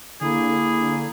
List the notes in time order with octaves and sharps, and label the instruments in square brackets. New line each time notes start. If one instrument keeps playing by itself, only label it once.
[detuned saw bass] D3 [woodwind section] A#3 E4 [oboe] G#4